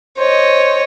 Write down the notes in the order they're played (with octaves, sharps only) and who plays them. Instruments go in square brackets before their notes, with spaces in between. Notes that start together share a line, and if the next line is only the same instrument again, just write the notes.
[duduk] C5 [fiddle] C#5 D#5